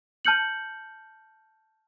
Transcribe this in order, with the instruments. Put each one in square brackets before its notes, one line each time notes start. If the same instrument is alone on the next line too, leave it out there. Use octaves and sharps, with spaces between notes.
[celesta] A5 F6 G6 C#7 F#7